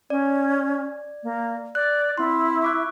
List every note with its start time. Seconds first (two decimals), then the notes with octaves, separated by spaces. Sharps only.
0.10 C#4 D5
1.23 A#3
1.75 D5 F#6
2.18 C4 E4 C6
2.62 C#6 D6 F#6